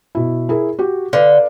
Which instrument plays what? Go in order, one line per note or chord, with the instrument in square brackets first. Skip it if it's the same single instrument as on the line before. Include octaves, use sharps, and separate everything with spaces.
[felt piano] B2 E4
E4 G#4 A#4
F#4 G4
[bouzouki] D3 [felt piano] B4 D5 F5